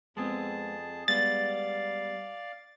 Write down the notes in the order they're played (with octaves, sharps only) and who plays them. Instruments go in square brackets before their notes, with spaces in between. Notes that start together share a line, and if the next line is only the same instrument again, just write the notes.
[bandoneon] F2 G#4 A5 [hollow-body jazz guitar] G#3 B3 C4
[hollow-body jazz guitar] G3 G#3 B3 [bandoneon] D5 F5 [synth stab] A6